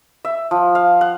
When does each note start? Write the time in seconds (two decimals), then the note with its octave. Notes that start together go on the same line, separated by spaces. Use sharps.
0.25 E5
0.51 F3
0.75 F5
1.01 F#5